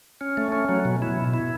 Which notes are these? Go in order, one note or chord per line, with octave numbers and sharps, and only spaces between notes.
C#4
A3
C#4
F#3
B2
E4
B2
E4